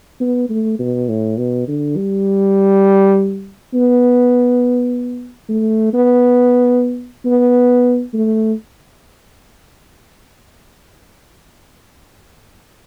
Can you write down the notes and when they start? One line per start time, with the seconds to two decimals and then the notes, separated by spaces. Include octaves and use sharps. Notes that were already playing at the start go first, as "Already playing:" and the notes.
0.20 B3
0.49 A3
0.79 B2
1.09 A2
1.38 B2
1.68 D3
1.97 G3
3.74 B3
5.49 A3
5.93 B3
7.25 B3
8.14 A3